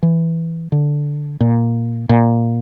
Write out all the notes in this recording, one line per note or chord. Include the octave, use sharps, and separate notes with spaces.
E3
D3
A#2
A#2